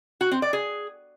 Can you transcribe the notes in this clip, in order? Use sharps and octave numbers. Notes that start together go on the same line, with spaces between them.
F#4
C4
D5
G#4